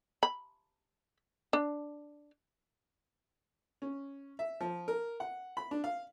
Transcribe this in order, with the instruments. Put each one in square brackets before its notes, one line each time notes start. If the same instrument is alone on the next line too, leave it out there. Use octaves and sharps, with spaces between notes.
[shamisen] B5
D4
[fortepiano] C#4
E5
F3
A#4
F#5
B5
D4
F5